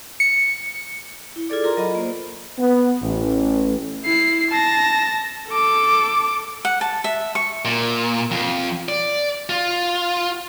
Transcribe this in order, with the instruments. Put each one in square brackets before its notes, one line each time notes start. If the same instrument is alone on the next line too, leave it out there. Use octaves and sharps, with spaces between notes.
[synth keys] C#7
[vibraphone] E4
F4 G#4 A4 D5 D6
F4 A#4 A#5 C6
F#3 D#5 A#5 B5
A#3 C5
[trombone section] B3
A1
[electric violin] E4 C7
A5 A#6
A4 D6
[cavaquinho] F#5
A5
E5
C#6
[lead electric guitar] A#2
F2
D5
F4